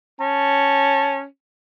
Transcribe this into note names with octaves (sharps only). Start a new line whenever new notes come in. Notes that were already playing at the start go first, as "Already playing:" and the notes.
C#4 A5